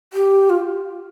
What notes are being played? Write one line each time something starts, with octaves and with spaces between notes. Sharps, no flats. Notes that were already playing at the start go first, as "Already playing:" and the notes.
G4
F4